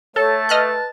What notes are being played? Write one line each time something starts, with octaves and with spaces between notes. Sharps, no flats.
A3 A4 C#5 A5
B4 D#5 F6 F#6